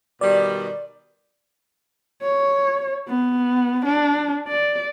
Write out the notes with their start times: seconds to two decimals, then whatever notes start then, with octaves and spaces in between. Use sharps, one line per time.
0.21 B2 D#3 G3 D5
2.22 C#5
3.08 B3
3.85 D4
4.48 D5